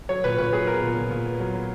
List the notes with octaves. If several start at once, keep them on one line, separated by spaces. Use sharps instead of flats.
F#3 C#5
A#2 B4
A#2 B4
F#3 G#4
B3 A#4
A#2
A#2
A#2
B3
F#3
F#3